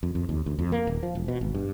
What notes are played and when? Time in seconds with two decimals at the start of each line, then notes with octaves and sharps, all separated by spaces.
0.03 F2
0.15 F2
0.29 D#2
0.46 D2
0.59 F2
0.72 A#3
0.87 D#1
1.03 F3
1.15 E1
1.28 B2
1.41 G#1
1.55 G2